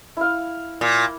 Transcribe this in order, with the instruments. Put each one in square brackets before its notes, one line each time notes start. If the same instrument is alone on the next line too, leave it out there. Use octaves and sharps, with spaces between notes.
[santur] E4 F5
[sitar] A#2